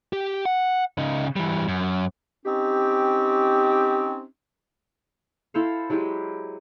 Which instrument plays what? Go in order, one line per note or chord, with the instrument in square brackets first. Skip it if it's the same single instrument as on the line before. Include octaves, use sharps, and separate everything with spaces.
[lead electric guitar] G4
F#5
C#3 D#4
E3 G3
F#2
[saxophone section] C4 C#4 D#4 G4
[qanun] E4 A4 C5 F5
F#3 G#3 E4 G4